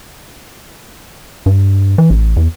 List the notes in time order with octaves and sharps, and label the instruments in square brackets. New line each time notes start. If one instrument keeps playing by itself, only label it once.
[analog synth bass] G2
E3
A1
E2